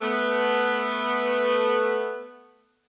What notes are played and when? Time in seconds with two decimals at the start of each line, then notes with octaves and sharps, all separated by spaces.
0.01 A3 B3